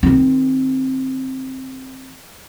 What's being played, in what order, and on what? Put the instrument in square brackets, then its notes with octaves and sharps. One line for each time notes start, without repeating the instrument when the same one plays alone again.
[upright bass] D#3 C4